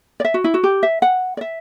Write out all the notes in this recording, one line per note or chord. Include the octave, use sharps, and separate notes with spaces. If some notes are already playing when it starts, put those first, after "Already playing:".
D5
E5
F#4
E4
F#4
G4
E5
F#5
D5
E5